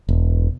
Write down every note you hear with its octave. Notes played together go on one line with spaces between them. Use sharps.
E1